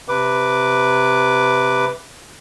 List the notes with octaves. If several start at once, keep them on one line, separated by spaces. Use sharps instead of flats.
C3 B4 D6